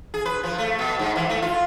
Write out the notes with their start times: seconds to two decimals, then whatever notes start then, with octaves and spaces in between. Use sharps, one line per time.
0.14 G#4
0.25 B4
0.44 F3
0.58 A3
0.79 B2
0.99 G#2
1.16 E3
1.29 A3
1.42 F4